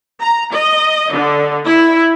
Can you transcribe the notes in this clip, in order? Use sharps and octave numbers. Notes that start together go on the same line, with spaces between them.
A#5
D#5
D3
E4